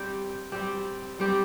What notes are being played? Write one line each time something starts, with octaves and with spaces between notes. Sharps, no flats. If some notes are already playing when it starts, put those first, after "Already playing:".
Already playing: G3 C4 G4
G3 C4 G4
G3 C4 G4